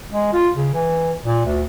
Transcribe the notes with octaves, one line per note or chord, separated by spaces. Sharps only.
G#3
F4
C#3
E3
A#2
D2